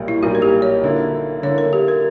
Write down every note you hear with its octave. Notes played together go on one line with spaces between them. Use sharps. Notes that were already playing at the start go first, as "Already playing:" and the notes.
Already playing: B1 A#2 G3 A#3
E4
B1 A#2 G3 A#3 F#4
A#4
G4
C#5
D3 A#3 E4
D3 A#3 E4 C#5
A#4
G4
A#4